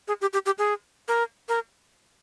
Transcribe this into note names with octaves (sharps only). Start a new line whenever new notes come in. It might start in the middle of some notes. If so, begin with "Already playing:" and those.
G#4
G4
G4
G4
G#4
A#4
A#4